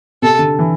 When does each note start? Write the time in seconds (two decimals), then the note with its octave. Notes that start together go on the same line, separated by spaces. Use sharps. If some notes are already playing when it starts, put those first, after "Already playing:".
0.22 C3 A4
0.39 D3
0.59 E3